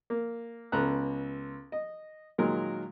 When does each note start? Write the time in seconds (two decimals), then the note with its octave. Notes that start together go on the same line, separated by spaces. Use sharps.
0.10 A#3
0.72 C#2 B3 A4 A#5 F#6
1.72 D#5
2.38 A#2 D#3 F#3 G#3 A#4